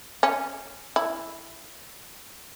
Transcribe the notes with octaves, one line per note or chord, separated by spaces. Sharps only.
C#4
E4